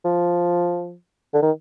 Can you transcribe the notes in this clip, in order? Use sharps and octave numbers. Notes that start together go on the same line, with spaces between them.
F3
D3
D#3